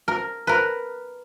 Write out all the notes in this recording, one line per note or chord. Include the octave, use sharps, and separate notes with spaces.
A#4
A#4 B4